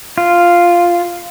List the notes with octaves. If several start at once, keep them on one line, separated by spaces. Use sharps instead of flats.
F4